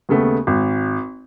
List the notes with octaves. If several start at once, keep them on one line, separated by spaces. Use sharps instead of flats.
D#2 C#3 A3 B3
G#1